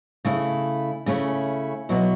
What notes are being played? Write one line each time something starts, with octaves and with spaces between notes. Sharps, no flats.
C#3 A3 E4
C#3 A3 C#4 E4
B2 F#3 B3 E4